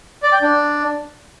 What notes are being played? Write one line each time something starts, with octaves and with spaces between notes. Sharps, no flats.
D5
G5
D4